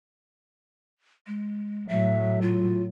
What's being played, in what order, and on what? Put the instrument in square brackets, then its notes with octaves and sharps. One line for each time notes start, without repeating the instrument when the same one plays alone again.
[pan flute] G#3
[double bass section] A2 F#3 [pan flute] E5
[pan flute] F4